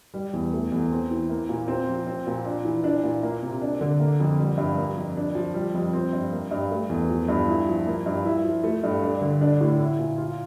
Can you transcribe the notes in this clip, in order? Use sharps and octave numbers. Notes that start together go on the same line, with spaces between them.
G3
E2
A3
E2
C4
E3
A#3
A#2
C4
F3
C4
A#2
D4
E3
D4
A#2
A#3
C3
D4
D3
A#3
F2
G3
G2
A#3
F2
D4
F3
G3
F2
C4
G2
A#3
G2
A3
E2
F3
G2
E4
F3
A#3
G2
E4
F3
A3
G2
D4
D3
D4
A2
E4
A#2
F4